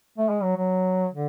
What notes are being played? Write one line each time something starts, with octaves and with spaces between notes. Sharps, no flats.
A3
G#3
F#3
F#3
D3